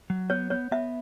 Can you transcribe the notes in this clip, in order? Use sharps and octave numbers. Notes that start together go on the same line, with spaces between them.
F#3
B3 C#5
B3 C#5
B3 E5